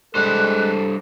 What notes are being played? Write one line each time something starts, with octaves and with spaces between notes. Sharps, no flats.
G3 G#3 D4 A4 C5 F#6